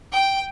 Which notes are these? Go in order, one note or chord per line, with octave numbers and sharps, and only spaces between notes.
G5